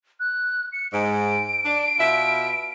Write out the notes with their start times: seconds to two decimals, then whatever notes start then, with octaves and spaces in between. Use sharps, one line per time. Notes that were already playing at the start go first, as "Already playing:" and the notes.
0.20 F#6
0.73 C#7
0.93 G#2 D7
1.65 D4
1.99 B2 F4 E5